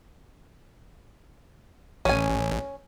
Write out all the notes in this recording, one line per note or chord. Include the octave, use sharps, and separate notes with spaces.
A1 C#4 G#5